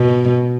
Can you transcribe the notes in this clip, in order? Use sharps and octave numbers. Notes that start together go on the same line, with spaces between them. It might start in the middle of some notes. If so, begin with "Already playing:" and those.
Already playing: B2